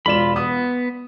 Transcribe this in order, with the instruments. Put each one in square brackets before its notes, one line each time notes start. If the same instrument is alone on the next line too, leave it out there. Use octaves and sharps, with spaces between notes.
[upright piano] E1 D5 E7 [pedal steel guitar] F4 B5
[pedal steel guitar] B3 [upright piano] D#6